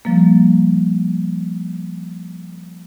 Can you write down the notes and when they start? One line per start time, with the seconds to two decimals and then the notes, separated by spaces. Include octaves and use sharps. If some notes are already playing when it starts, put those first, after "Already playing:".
0.05 F3 G3 A#3